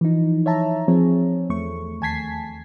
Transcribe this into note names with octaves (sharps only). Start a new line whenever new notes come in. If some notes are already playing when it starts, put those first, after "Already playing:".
E3 F3 D#4
C#5 E5 A5 A#5
F3 C4 G#4 C#5
E2 A3 C#6
D#2 G#5 A5 G#6 B6 C7